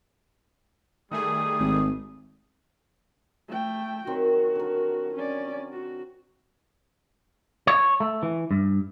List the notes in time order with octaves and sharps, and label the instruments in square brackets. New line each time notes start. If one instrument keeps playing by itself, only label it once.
[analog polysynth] D#3 A3 G#4 [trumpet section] G3 D#6
[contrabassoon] G#1
[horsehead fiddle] A3 G5
[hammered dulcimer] D#3 F#3 C4 [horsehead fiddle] F#4
[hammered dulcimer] D3 A#4
[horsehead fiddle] C#4 D5
F#4
[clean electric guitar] C#5
A3
E3
G2